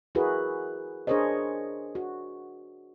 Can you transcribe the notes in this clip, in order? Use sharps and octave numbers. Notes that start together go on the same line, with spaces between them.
E4 F#4 G#4 A#4 B4
D4 G#4 A#4 C5 C#5 D#5
F#4